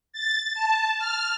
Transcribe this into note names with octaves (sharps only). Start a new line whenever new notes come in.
A6
A5
F6